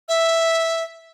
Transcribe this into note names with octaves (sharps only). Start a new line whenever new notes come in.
E5